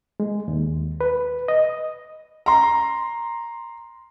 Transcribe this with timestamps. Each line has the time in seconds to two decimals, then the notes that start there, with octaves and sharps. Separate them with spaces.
0.20 G#3
0.48 D#2
1.01 B4
1.48 D#5
2.46 A#5 C6